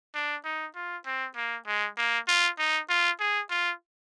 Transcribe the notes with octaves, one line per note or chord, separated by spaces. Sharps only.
D4
D#4
F4
C4
A#3
G#3
A#3
F4
D#4
F4
G#4
F4